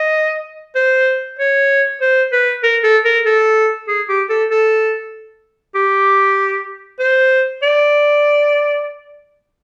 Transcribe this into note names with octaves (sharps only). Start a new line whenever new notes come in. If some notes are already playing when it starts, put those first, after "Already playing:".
Already playing: D#5
C5
C#5
C5
B4
A#4
A4
A#4
A4
G#4
G4
A4
A4
G4
C5
D5